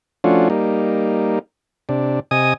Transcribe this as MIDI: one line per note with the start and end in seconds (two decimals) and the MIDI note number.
0.24 0.49 53
0.24 0.49 57
0.24 0.49 61
0.24 0.49 62
0.24 0.49 65
0.24 0.49 66
0.50 1.39 55
0.50 1.39 58
0.50 1.39 63
1.89 2.20 48
1.89 2.20 62
2.31 2.54 48
2.31 2.54 75
2.31 2.54 80
2.31 2.54 87